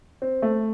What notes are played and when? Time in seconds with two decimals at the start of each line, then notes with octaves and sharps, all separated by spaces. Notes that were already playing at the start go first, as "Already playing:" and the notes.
0.22 C4
0.42 A3